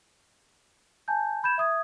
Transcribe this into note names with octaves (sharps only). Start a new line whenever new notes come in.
G#5 A5 G6
B5 G6 G#6 E7
E5 D#6 G#6